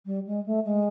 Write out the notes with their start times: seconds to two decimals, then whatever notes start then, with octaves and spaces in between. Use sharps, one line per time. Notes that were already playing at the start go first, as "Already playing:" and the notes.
0.06 G3
0.26 G#3
0.46 A3
0.64 G#3